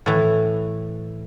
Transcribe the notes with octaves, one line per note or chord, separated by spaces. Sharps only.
A2 E3